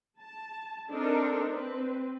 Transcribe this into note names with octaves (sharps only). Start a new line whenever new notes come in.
A5
C4 D4 D#4 A4 A#4
C4 B4